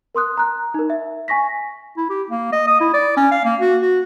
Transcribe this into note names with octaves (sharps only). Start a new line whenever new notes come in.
A#4 C6 D#6 F#6
A#5 F#6
D#4 A#4
E5
G#5 C#6 A#6 B6
E4
G4
A#3
D#5
D#6
E4
D5
C#4
F5
A#3
F#4
F#4